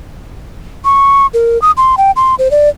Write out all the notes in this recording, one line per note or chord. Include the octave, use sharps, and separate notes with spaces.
C#6
A#4
D#6
C6
G5
C6
C5
D5